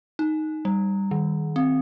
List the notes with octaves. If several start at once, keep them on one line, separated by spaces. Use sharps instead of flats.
D#4
G3
D#3
C4